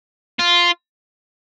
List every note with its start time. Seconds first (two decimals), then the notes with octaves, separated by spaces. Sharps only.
0.39 F4